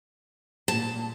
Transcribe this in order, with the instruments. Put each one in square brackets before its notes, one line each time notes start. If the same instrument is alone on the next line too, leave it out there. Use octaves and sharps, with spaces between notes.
[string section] A#2 [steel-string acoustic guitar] A5